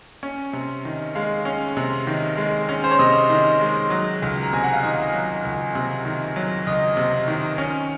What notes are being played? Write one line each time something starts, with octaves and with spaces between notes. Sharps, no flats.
C#4
C3
D#3
G#3 F5
C#4
C3
D#3
G#3
C#4
C5
C#5
C3 D#5
D#3
G#3
F#3
C#2
A#5
C3 G#5
F#5
F5
D#3 D#5
F#3
C#2
C3
D#3
F#3
C#2 D#5
C3
D#3
C#4